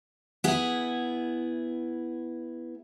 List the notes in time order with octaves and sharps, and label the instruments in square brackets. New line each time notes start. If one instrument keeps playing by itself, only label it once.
[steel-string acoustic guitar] B3 E4 G#4